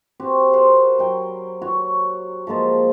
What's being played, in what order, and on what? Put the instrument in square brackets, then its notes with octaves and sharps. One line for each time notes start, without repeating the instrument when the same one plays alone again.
[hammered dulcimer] C4 F#4 G4
A#4 C5 F#5 B5
F#3 G5
F#4 C#5
F3 G#3 A#3 A5